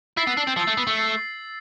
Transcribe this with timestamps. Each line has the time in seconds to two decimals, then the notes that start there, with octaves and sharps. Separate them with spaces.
0.17 E4 E6 A6 C7
0.27 B3
0.37 D4
0.47 C4
0.57 F3 C7
0.60 E6 A6
0.67 A3
0.77 B3
0.87 A3
0.97 C7